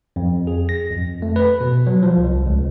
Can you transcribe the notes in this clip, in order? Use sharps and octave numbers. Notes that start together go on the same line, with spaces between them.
F2
G#4
A#6
F2
A3
B4
B2
F#3
F3
C2
C#2